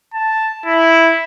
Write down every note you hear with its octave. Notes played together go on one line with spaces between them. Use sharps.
A5
E4